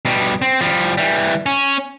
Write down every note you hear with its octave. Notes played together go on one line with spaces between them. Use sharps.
B2 G3
C4
F3 G3
E3 G3
C#4